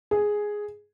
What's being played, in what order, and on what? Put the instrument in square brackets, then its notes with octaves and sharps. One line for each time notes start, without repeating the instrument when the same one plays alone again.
[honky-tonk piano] G#4